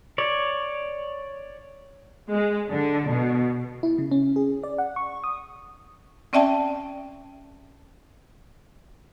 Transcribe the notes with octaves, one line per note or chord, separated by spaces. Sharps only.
C#5 D5
G#3
D3
B2
E4
C#3
C#4
G#4
D5
F#5
C#6
D#6
C4 C#4 D5 E5 G5 A5